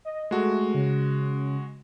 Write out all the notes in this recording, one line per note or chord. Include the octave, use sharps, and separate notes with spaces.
D#5
G#3 A3 F#4
C#3